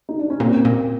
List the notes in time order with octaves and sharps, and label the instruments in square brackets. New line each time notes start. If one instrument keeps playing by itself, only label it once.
[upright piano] D#4
D4
C#4
[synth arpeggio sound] A#2 [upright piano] A#3 C4
[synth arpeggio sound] A#2